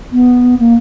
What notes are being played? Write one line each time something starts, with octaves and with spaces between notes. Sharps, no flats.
B3
A#3